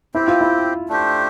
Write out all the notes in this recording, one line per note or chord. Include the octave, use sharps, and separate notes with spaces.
C4 E4 G4 C5
F4
E4
A3 D4 G4 C5